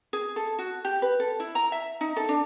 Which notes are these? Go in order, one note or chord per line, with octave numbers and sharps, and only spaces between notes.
G#4
A4
F#4
G4
B4
A4
E4
A#5
E5
D#4
A4
D4